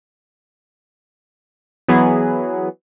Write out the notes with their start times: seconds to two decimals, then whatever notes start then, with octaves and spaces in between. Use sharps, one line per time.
1.88 E3 F#3 B3 G#4 B4